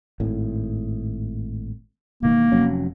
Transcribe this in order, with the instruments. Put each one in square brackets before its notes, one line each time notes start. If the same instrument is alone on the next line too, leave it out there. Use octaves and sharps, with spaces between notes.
[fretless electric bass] G#1 A2
[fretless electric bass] E1 D#3 [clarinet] A#3
[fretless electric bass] F1 F#3 C#4